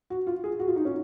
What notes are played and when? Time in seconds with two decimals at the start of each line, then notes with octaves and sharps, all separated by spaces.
0.10 F#4
0.27 F4
0.44 G#4
0.60 F#4
0.68 F4
0.76 D#4
0.85 C#4